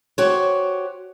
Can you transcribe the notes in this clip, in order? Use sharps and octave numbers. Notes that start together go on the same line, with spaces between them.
F#4 G4 C5 C#5